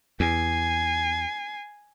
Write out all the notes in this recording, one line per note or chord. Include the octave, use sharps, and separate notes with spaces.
E2 G#5 C7